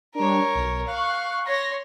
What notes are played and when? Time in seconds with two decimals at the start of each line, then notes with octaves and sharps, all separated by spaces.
0.15 G3 D4 A#4 C#5
0.55 B1
0.87 F5 C#6 F#6
1.46 C#5 C6 A#6